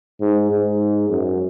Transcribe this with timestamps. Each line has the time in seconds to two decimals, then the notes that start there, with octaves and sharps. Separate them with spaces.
0.21 G#2
0.51 G#2
1.10 F#2